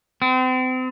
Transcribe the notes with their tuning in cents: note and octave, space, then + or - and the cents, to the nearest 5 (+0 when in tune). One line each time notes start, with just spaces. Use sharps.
C4 -35